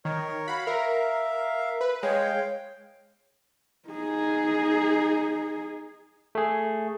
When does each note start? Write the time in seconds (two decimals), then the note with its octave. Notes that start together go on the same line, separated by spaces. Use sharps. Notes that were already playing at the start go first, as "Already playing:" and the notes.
0.05 D#3 A#4 C#5
0.48 F#4 F5 F#5 B5
0.67 A#4 E5 F5
1.81 B4
2.03 G#3 C#5 F5 G5
3.89 D#4 G#4
6.35 A3 G#4